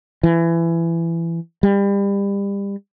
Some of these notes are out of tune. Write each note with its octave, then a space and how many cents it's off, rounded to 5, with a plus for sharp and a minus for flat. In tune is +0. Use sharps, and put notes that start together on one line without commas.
E3 +20
G3 +30